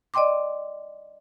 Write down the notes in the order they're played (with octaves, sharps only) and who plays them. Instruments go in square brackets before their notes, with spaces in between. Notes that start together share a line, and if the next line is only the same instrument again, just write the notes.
[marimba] D5 D#5 G5 C6 D6